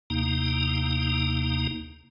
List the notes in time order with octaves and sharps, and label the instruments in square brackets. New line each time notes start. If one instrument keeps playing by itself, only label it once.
[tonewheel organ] D#2 C3 A#3 D#4